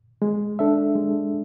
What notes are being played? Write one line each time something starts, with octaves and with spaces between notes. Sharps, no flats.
G#3
D4 A4 E5
G#3